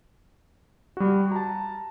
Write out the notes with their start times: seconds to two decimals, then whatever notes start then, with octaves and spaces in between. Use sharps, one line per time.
0.97 G3 F#4
1.32 A5 A#5